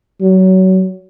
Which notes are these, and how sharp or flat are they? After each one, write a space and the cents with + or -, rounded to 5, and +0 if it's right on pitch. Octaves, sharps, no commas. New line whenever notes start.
F#3 +25